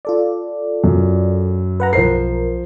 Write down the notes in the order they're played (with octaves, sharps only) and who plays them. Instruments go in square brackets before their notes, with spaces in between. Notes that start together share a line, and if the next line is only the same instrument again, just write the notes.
[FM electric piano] F4 A4 D5
[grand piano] F#2
[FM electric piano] B4 F#5 A#5
[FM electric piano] B1 A#4 [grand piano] F3 C5 C7